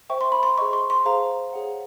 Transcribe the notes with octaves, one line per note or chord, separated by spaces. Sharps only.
C5 E5 G5 C#6
C6
B5
C6
G#4 C5 D#5 C#6
C6
C6
G#4 C5 F5 A#5
G#4 C#5 F#5